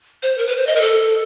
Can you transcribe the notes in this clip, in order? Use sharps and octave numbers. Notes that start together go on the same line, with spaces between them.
C5
A#4
B4
C5
D#5
A#4
A4